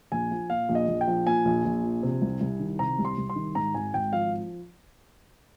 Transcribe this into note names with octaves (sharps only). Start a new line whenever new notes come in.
A#1 G#5
F3
A#2 F5
A#1
D#5
A#1
G5
F3
A#2 G#5
A#1
A#1
F3
C3
C2
C2
D#3
C3 A#5
C2
C6
C2
C6
D#3
G#2 A#5
G#1 G#5
G#1 G5
F3 F5